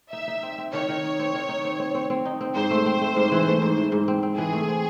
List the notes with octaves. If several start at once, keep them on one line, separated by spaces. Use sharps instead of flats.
D#4 E5
D#4
C4
C4
D#3 C#5
D#3
D#4
C4
D#3
D#4
C4
C4
C4
C4
D#4
C4
G#2 C5
A3
C4
A3
G#2
E3
A3
G#2
E3
G#2
C4
C4
E3 G#4
A3
C4